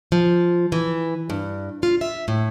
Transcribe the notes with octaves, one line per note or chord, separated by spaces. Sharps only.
F3
E3
G2
F4
E5
A2